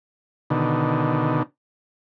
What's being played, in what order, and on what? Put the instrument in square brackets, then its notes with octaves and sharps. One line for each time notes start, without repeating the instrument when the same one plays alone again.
[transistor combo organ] B2 D3 D#3